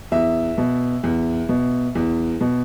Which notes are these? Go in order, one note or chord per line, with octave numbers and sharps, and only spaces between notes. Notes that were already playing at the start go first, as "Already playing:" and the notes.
E2 E5
B2
E2
B2
E2
B2